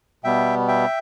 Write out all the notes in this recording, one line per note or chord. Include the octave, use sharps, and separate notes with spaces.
B2 G3 B3 E5 G5
E5 G5